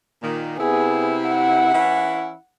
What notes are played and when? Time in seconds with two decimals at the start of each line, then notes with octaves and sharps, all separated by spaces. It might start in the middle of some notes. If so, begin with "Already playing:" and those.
0.23 A#2 D#3
0.58 C3 B3 E4 G#4
1.29 F#5
1.73 E3 C#4 E4